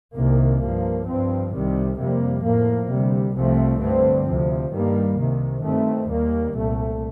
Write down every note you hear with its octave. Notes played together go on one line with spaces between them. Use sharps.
C2 C3 D#3 A#3
G2 F3 A#3
G2 F3 C4
C2 C3 D#3 G3
F2 C3 G3 A#3
A2 F3 A#3
D2 C3 G3
C2 C3 F3 A3 C4
G2 D3 A3 C4
D2 C3 F3
G2 D#3 G3 A#3
C2 C3 D#3
G2 D#3 A3 C4
D#2 D#3 G3 A#3
C2 A#2 A3